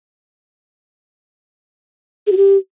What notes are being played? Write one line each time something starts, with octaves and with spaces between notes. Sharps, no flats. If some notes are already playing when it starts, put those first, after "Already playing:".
G#4
F#4
G4